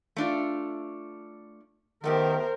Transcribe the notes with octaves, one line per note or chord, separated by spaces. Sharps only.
A3 D4 F4
D#3 A3 B3 G4 A#4 C5